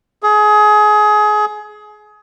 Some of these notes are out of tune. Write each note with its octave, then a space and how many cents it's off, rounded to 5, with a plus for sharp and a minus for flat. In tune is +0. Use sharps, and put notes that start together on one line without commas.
G#4 +25